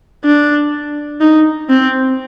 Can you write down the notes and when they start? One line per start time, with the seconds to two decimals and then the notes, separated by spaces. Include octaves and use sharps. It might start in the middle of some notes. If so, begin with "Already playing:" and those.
0.25 D4
1.21 D#4
1.70 C4